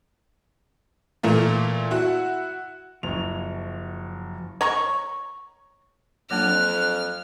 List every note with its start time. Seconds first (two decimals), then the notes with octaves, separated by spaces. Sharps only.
1.23 A#2 E3 A3 A#3
1.91 E4 F#4 F#5
3.03 F#1 F3 F#3 F7
4.61 C#5 A#5 C#6
6.31 F2 F#3 A#3 D4 F6 F#6